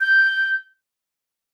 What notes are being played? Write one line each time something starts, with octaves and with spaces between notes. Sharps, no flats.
G6